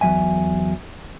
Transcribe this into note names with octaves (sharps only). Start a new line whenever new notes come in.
E2 F3 F#3 E5 G#5